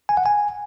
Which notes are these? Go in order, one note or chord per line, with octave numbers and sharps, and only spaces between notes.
G#5
F#5
G#5